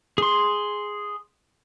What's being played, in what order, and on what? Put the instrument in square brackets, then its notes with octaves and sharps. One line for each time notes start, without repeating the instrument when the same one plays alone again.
[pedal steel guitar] G#4 C6